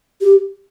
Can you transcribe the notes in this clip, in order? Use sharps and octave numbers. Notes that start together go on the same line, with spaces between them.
G4